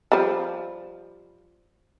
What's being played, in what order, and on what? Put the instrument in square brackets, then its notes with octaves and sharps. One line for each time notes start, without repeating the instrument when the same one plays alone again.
[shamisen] F3 G3